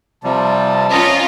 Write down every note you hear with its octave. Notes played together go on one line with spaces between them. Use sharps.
C3 F3 G3 A5
C#4 F4 D#5 A#5